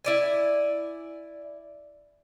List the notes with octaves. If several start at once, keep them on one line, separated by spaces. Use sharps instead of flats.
E4 D5 G#5